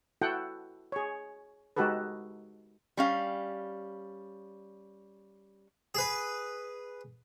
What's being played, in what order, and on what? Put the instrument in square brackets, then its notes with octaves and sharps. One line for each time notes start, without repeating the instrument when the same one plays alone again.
[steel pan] E4 F#4 A4 F#5 G5
G#4 C#5
G#3 D#4 F#4 G4 A4 B4
[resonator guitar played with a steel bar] G3 C#4 F5
[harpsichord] G#4 B4